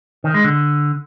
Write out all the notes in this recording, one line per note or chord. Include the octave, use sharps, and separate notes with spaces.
D#3
G#3
D3